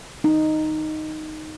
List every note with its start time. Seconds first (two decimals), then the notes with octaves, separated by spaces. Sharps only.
0.24 D#4